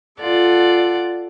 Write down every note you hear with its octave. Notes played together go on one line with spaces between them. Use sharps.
F4 A4 D5 F#5